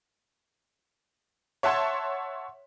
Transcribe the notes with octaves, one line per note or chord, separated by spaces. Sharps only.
C#5 E5 F#5 A5 C6 G#6